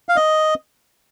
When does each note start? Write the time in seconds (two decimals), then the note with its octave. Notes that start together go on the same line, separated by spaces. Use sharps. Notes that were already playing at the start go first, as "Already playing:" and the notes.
0.09 F5
0.16 D#5